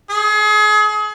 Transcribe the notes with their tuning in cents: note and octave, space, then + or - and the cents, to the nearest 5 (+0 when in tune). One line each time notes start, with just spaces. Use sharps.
G#4 +35